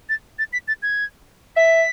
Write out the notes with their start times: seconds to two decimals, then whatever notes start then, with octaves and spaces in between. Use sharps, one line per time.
0.09 A6
0.39 A6
0.53 B6
0.68 A6
0.82 G#6
1.56 E5 B6